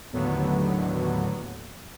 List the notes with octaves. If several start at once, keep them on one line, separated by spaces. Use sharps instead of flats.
D#2 A2 D3 F#3 B3